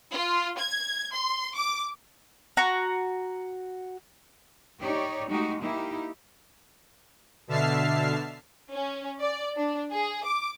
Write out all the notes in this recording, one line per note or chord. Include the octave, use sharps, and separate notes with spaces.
F4
G#6
C6
D6
F#4 A#5
D#4 G4 C#5 D5
G#3 A3 D#4 F#4 G4
A#3 D#4 E4 G4
B2 D3 E5 A5 F6 C7
C#4
D5
D4
G#4
D6